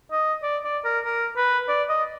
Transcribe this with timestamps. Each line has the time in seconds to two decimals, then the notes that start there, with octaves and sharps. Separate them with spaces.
0.12 D#5
0.43 D5
0.64 D5
0.85 A#4
1.05 A#4
1.37 B4
1.69 D5
1.89 D#5